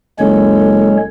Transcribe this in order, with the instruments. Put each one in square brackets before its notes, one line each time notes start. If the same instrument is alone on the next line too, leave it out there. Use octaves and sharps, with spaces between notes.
[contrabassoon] F#1 [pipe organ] G#3 C#4 C#5 [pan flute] A4